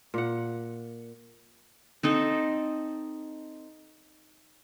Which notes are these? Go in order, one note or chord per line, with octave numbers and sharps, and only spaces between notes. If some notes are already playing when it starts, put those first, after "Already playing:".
A#2 F#5
C4 D#4 A4